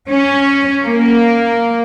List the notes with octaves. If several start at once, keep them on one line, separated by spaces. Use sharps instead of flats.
C#4
A#3